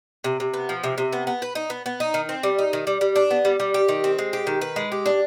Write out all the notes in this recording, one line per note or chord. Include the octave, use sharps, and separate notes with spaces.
C3
C3
B3
F3
C3
C3
B3
B3
B4
D#4
B3
B3
D#4
D#3
C4
G3
D#4
D#3
G3
G3
D4
B3
G3
G3
G4
D#3
C4
G#3
G4
D#3
B4
G#3
G4
D4